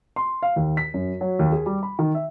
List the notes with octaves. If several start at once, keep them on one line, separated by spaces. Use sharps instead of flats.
C6
F5
D#2
B6
F#2
F#3
D#2
G#4
G3
B5
D#3
E5